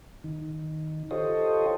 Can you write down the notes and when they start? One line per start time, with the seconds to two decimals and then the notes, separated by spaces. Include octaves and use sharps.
0.24 D#3
1.11 F4 G4 A4 C5 C#5 D#5